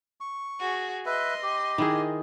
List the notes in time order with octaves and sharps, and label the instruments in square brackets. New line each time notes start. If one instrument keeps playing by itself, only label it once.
[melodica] C#6
[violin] F#4 G#4
[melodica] B4 E5 [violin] D#5 C6
[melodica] G4
[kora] D#3 E4 G#4